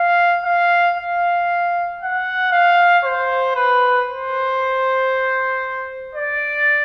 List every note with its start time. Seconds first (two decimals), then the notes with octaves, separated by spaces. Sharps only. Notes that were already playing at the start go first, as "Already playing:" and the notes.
Already playing: F5
0.45 F5
0.96 F5
2.00 F#5
2.52 F5
3.04 C5
3.55 B4
4.07 C5
6.15 D5